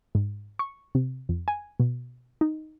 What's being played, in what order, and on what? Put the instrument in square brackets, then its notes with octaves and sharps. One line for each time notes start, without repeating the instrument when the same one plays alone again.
[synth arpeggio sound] G#2
C#6
C3
F2
G#5
B2
D#4